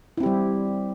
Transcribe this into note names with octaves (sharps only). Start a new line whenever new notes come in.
G3 C4 E4 G4